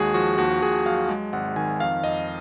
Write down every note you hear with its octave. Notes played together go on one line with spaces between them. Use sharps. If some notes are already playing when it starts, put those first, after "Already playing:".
Already playing: D#2 G#3 F#4 G#4
F3 F#4
D#2 F#4
D#2 G#4
F#3 F5
G#3
G#1 F#5
D#3 G#5
F2 F5
F2 D#5